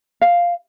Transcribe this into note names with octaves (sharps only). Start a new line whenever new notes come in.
F5